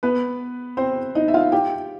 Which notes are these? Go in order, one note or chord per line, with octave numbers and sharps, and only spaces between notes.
B3 B4
C4 C5
D#4 D#5
E5
F4 F5
G4 G5